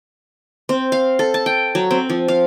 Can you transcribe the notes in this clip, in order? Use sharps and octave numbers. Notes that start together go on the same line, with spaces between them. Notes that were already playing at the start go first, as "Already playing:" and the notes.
C4
F5
A4
A5
G5
F#3
C4
F3
F5